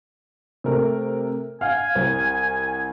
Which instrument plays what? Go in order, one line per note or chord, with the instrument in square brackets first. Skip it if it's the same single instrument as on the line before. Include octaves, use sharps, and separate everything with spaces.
[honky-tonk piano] C3 A3 A#4
[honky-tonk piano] F5 F#5 F6 [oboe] G#5
[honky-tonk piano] C2